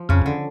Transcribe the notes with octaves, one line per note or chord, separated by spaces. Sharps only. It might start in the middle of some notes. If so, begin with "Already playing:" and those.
Already playing: F3
F2 C#3
D3